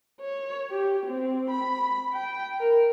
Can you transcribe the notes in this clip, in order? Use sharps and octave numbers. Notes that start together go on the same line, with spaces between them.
C#5
G4
C4
B5
G5
A#4